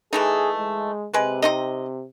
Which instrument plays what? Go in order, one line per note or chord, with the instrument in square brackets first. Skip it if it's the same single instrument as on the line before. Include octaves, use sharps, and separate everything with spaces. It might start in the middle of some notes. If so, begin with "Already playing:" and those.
[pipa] E3 A3 D#4 [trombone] G#4
[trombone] G#3
[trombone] C3 [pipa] G#3 B4
[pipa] C4 D#4 D#5